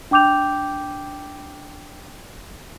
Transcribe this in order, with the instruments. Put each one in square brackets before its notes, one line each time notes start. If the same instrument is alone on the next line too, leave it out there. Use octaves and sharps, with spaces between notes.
[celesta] D4 G5 D6 G6 F7